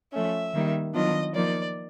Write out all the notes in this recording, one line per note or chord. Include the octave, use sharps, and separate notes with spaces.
F3 A3 C#4 E5
D#3 G3 A#3 D#4
D#3 F#3 B3 D4 F4 D#5
F3 A#3 D#4 D5